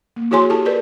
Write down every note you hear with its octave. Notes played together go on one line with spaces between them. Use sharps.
A#3
E4 F#4 G#4 C#5 G#5 C6
E4 G4 A4 A5
G#4 A#4 B4 D5